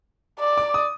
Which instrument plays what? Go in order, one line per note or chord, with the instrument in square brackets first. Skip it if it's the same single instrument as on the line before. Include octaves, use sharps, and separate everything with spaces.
[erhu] D5
[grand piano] D6
D#6